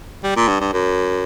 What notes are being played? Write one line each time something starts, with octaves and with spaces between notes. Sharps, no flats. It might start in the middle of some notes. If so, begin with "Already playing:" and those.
G3
A#2
G2
G2
F#2